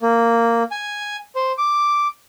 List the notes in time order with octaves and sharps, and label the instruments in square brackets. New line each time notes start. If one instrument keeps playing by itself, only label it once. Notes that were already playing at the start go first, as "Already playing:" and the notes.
[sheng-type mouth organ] A#3
G#5
C5
D6